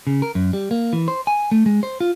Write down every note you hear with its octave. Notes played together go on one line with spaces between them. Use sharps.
C#3
A#4
F#2
G3
A#3
E3
C5
G#5
A3
G#3
C5
F4